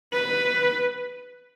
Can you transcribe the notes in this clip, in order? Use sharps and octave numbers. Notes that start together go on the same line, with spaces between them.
B4